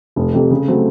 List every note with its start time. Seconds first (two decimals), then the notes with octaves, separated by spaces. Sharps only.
0.16 F1
0.34 F2 C3
0.50 C#3
0.68 F#3 A3 C4